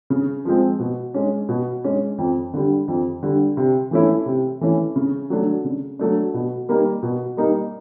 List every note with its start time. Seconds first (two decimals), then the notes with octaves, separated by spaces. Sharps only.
0.10 C#3
0.45 F3 G#3 C4
0.79 B2
1.14 G#3 C#4
1.49 B2
1.84 G#3 C#4
2.18 F2
2.54 D3 G3
2.88 F2
3.23 D3 G3
3.57 C3
3.91 E3 A3 C#4 E4
4.26 C3
4.61 E3 A3 C#4 E4
4.96 C#3
5.30 F#3 A3 D4
5.64 C#3
5.99 F#3 A3 D4
6.34 B2
6.69 G3 A#3 D#4
7.03 B2
7.37 G3 A#3 D#4